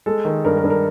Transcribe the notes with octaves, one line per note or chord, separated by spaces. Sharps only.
G#3 A4
D#3
G2 A#4
A#4
G2
A#4